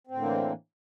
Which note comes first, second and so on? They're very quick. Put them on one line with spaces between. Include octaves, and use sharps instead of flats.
C4 A2 D3 A#3 E3